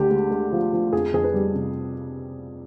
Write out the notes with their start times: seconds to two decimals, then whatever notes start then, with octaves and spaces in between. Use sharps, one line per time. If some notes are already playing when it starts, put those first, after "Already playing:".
Already playing: D2 D3 G4
0.11 G#3
0.31 G#3
0.52 F3
0.73 F3
0.93 F2 G#4
1.13 F2 G#4
1.24 B4
1.34 G3
1.55 C3